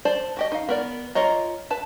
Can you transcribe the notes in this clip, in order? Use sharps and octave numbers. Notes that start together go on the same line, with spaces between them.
C5 D5 A5
F#4 G4 D#5
D#4 F5
B3 A#4 D5
F4 A#4 C#5 D#5 A#5
B4 A5